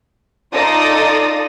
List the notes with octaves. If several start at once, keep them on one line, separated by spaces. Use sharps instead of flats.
D#4 F4 A4 D5 D#6 A#6